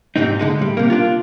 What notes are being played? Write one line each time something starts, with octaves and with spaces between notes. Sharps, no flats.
G#2 C3 C4 D#4
D3 G#3 D#4
A2 G3
C3 A#3
D4 F4